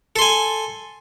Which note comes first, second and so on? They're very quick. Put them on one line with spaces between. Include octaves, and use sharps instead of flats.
A4 C6 G#5